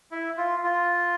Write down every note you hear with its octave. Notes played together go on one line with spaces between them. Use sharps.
E4
F4
F4